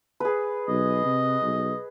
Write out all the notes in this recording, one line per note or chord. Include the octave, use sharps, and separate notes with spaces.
G#4 B4
B1 D#5
C3
B1